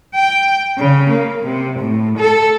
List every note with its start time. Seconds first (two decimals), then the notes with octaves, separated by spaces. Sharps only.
0.15 G5
0.78 C#3
1.09 A#3
1.43 C3
1.79 A2
2.18 A4